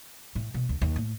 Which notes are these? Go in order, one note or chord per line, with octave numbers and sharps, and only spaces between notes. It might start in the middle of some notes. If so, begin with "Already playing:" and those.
A2
B2
D2
D#2
A2